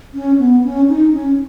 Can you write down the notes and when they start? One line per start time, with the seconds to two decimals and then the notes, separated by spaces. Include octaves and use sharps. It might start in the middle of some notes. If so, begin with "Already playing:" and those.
0.14 C#4
0.39 B3
0.64 C#4
0.89 D#4
1.13 C#4